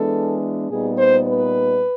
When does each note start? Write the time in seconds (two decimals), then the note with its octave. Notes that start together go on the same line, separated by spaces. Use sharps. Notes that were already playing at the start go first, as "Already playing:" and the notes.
Already playing: E3 G#3 B3 D4 A4
0.69 A#2 G3 B3 D#4 G#4
0.98 C5
1.27 B4